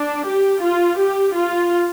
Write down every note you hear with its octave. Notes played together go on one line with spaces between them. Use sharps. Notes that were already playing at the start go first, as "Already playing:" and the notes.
Already playing: D4
G4
F4
G4
F4